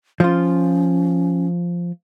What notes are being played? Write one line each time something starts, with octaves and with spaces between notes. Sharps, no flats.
F3 C#4 F4